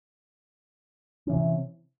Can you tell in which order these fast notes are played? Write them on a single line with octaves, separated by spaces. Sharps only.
C#4 E3 C3